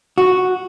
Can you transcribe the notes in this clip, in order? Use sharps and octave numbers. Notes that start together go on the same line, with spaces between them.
F#4